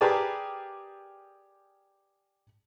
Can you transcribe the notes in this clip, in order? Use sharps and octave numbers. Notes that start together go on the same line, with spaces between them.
G4 G#4 A#4 B4 D5 A5